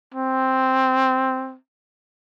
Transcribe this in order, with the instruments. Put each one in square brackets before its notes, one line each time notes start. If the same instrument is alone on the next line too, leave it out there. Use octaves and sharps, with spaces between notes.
[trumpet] C4